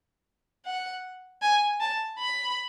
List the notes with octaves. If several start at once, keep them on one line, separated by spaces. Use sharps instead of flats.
F#5
G#5
A5
B5